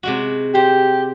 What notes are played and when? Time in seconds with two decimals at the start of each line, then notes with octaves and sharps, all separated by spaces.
0.03 C3 G#3 F#4
0.55 G4 C5